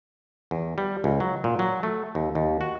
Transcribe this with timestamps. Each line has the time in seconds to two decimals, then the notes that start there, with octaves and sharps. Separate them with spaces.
0.51 E2
0.78 G3
1.04 C#2
1.20 F#3
1.44 A#2
1.59 F#3
1.83 A3
2.15 D#2
2.35 D#2
2.61 F#4